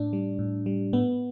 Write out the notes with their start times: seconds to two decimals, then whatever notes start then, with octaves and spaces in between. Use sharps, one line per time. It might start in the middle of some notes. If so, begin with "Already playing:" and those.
Already playing: A2 D4
0.13 G3
0.39 A2
0.66 G3
0.93 A2 B3